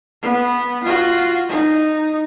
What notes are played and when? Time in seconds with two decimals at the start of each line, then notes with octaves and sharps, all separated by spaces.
0.22 B3
0.84 F4 F#4
1.49 D#4